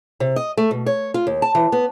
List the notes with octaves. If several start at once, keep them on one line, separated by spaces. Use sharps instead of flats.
C3
D#5
A3
B2
C#5
F4
D#2
A5
E3
B3